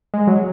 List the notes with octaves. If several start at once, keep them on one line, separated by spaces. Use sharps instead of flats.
G#3
F#3